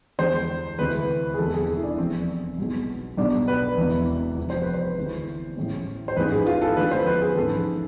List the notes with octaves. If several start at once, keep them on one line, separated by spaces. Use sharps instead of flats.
E2 D3 G#3 C5
D2 C3 E3 G#3 B4
G#4
E1 E2 C3 E3 G#3 A4
G#4
E4
D4
F1 E2 C3 C4
B1 B2 G#3
B1 B2 G#3 D4
B4
E1 E2 C3 E3
F1 F2 C3 F3
C5
B4
C5
D2 C3 E3 G#3
A1 A2 G#3
C5
A1 G#2 E3 G#3 B4
G#4
F4
A4
E2 D3 F3 G#3 B4
C5
B4
G#4
A1 G#2 F3 G#3 A4